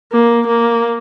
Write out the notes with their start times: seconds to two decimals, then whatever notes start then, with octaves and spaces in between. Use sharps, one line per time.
0.12 A#3
0.47 A#3